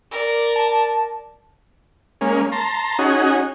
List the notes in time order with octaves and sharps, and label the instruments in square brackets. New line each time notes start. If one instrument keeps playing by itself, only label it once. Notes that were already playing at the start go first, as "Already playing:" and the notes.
[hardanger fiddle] A#4 D5
[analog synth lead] A5
[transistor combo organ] G#3 A#3 C#4
A5 A#5 C6
C#4 D#4 F#4 G#4